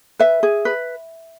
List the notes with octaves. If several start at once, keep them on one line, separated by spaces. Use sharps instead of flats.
B4 E5
G#4
B4